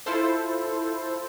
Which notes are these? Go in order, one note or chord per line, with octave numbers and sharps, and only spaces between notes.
E4 F4 A4 C5